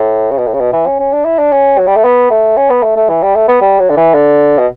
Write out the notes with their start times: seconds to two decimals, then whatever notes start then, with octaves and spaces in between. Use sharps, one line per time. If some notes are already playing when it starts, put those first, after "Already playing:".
Already playing: A2
0.31 C#3
0.38 B2
0.47 A2
0.54 C#3
0.60 B2
0.73 E3
0.86 C#4
1.00 C#4
1.13 D4
1.25 E4
1.38 D4
1.52 C#4
1.78 F#3
1.87 G3
1.96 A3
2.04 B3
2.30 A3
2.57 C#4
2.70 B3
2.83 A3
2.96 A3
3.09 E3
3.22 G3
3.35 A3
3.48 B3
3.61 G3
3.79 F#3
3.90 D3
3.97 E3
4.14 D3
4.58 B2